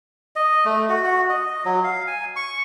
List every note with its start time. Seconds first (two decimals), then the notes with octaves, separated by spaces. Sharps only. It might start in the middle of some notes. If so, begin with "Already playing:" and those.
0.36 D#5
0.65 A3
0.89 F#4
1.04 F#4
1.29 D#5
1.65 F#3
1.84 F5
2.07 G#5
2.36 C#6